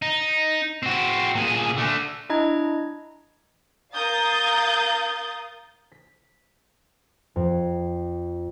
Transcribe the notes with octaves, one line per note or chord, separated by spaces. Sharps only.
D#4
C4 F#4
A#2 G#4
D3 A3
D4 E4 D#5 A#5 G#6
A#4 F5 A#5 D#6 G6 A6
B6
F2